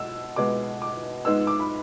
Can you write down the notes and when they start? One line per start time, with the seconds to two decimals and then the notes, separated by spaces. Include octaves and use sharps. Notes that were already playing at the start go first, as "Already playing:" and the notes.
Already playing: B2 G#3 E6
0.36 B2 G#3 B3 D6
0.82 D6
1.25 G#2 G#3 B3 E6
1.47 D6
1.60 B5